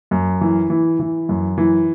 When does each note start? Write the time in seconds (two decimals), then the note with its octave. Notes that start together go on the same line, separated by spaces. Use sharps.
0.11 F#2
0.41 E3
0.70 E3
0.99 E3
1.29 F#2
1.58 E3